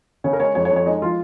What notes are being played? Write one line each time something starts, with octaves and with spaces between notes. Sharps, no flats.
C#3 C#5
A#4
G#3 C#5
F2 C#5
C#5
F2
C#5
G#3 D#4
F3 F4